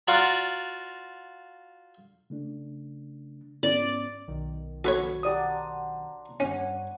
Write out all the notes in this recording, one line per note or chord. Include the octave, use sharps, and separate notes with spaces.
F4 F#4 D5 A#5
C#3 A3 D4
G#2 B3 C#4 D5
B1 D#3
F#4 A4 B4 C#5 C#6
F#3 D4 F#4 G4 D5 D#6
C5 A#5
G2 C#4 C#5 F#5